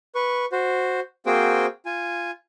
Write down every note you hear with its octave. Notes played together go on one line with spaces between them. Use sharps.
B4 C#6
F#4 C5
A#3 C4 F#4 G#4 C5 G5
F4 G#5